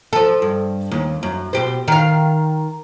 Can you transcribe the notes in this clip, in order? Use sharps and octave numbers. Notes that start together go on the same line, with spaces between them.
F3 A4
G2
D#2
F#2
B2 G4 C5
D#3 F5